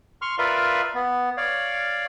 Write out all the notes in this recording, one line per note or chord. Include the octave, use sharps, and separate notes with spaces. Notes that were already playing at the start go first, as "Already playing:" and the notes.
C6 C#6 F6
F4 A#4 B4 D5 E5 F5
B3
C#5 D5 F5